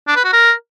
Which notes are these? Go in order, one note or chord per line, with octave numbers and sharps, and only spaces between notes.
D4
B4
F#4
A#4